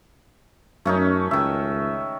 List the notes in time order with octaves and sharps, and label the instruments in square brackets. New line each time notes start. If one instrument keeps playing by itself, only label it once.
[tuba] F#2 [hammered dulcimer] A3 C#4 D#4
[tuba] C#2 [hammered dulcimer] D#3 E5